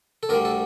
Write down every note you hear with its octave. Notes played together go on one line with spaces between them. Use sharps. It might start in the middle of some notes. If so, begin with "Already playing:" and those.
A4
D2 D3 G3 A#4
A4